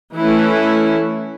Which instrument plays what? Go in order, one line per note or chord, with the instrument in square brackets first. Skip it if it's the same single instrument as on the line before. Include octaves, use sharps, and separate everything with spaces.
[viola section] E3 A3 C#4 E4